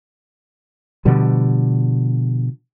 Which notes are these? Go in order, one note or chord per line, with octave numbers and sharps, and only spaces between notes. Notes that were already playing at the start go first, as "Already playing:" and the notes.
B2 D3 F3 G3